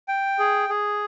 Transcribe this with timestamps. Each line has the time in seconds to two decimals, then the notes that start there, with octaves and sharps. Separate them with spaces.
0.08 G5
0.39 G#4
0.69 G#4